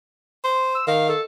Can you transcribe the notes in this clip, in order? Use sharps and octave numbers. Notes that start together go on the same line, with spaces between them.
C5
E6
D#3 F5
A4